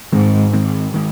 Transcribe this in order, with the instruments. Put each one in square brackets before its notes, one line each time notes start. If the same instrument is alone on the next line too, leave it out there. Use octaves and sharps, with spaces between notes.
[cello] G#2 [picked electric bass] D#3 G#3 C4
[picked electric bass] D#3 G#3 C4
D#3 G#3